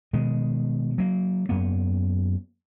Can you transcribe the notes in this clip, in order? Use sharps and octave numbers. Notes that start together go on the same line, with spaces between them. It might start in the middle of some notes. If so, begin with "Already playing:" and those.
B2 D#3 G#3
F#3 A#3
F#2 A#3 B3